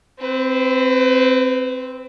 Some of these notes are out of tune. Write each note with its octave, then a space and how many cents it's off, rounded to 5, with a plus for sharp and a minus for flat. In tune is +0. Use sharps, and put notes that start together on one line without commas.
C4 +0 B4 +35